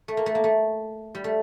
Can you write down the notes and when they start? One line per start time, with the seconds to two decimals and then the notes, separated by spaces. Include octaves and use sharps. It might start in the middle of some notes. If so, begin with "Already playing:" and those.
0.08 A3
0.17 A#3
0.26 A3
0.35 A#3
0.44 A3
1.15 G3
1.24 A3